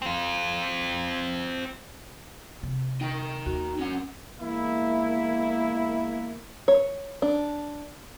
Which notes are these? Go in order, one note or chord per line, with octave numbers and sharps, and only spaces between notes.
C4 F4
C3
D#4 G5
D#2 F#4
C#4 F#5
E2 G#3 A#3 E4
C#5
D4